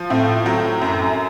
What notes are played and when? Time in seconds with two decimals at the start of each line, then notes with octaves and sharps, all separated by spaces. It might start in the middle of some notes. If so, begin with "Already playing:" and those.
Already playing: F3
0.10 A2 C4
0.46 F#3
0.81 F#2